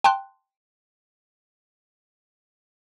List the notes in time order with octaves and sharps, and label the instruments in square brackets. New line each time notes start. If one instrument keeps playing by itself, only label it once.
[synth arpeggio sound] G5 A5 C6 F#6